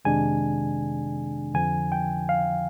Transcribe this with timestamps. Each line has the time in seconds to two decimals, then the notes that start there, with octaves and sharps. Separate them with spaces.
0.05 F2 C3 D#3 G#3 D4 G#5
1.54 F2 D3 F3 G#5
1.92 G5
2.29 F5